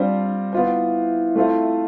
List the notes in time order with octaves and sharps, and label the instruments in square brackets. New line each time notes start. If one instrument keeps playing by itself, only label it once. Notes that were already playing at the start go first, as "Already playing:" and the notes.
Already playing: [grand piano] G3 C4 F4 C5 [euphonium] D4
[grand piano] B3 F4 C5 [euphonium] E4
[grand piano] A3 C4 F4 A4 C5